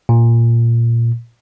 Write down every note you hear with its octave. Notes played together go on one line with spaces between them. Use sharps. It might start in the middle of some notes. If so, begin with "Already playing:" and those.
A#2